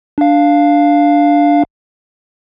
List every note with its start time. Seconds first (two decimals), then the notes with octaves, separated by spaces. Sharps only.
0.18 D4 F5